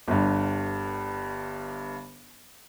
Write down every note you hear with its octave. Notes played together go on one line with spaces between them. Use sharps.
G1 G2